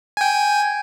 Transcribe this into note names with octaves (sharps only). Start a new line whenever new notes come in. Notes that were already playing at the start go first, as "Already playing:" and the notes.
G5 G#5